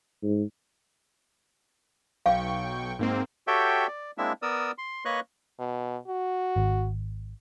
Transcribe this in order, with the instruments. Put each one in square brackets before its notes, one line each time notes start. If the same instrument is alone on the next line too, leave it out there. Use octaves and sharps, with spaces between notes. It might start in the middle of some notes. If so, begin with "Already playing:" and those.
[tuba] G#2
[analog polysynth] B1 G5 C#6 [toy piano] F5
[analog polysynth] G#2 A#3 C4
[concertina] F#4 G4 A4 C#5 E5 G5
D5
G#3 A#3 C4 D4 E4 E5
B3 A#4 D5 D#6 E6
C6
A#3 B4 C#5 D#5 C#6 F#6
[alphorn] B2
F#4
[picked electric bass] G#1